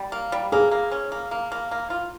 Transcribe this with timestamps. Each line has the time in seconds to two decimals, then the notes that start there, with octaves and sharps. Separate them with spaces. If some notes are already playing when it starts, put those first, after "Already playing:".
Already playing: G3
0.12 A#3
0.32 G3
0.52 A#3 G#4
0.71 A#3
0.91 C#4
1.12 A#3
1.31 A#3
1.52 A#3
1.71 A#3
1.90 F4